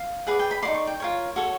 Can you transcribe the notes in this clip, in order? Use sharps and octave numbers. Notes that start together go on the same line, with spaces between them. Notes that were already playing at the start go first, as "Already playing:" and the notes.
Already playing: F5
G#4 B4 D5 F#5
G5
B5
D#4 F#4 A4 D5 C6
C#6
G5
F4 A#4 C#5
F#4 A4 C#5